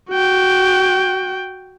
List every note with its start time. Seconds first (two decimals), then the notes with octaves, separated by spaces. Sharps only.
0.10 F#4 G5